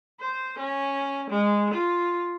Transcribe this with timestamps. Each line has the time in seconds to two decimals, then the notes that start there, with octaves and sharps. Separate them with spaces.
0.20 C5
0.59 C#4
1.30 G#3
1.74 F4